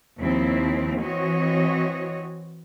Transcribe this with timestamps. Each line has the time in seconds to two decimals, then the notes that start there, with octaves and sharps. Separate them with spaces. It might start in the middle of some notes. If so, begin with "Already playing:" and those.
0.21 D#2 F3 C4 E4
1.02 E3 C4 F#4 C#5 D#5